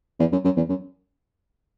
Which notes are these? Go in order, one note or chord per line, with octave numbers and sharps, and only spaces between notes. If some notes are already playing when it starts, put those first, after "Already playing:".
E2
F#2
F#2
E2
F#2